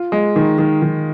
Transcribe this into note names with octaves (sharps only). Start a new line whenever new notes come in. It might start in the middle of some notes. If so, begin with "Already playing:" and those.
Already playing: F4
G#3
D#3
D#3
D#3